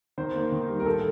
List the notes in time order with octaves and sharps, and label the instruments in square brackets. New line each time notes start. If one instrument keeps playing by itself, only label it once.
[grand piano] D#3 C5
A#3
D#3
G3
A#4
A2 A4